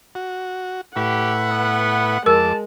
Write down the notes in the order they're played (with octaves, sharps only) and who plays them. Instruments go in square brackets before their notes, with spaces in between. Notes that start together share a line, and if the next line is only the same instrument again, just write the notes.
[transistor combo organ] F#4
[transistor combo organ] A2 E4 B4 [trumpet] G4 [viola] F#5
[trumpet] B3
[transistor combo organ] F2 D6 [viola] G#3 [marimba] A#4 E6 [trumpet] A5